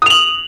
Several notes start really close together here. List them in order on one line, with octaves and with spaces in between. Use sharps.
D#6 F7 F#7